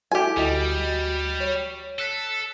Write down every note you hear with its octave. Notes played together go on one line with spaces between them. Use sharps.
E4 F#4 G4 A4 G#5
D2 G3 F#4 D#5
C#5
A4 E6 F#6 B6